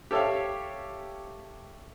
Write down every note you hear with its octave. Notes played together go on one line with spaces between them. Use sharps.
G4 A4 C#5 E5 F5